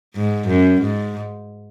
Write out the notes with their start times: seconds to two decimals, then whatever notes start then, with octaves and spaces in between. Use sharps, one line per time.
0.15 G#2
0.48 F#2
0.82 G#2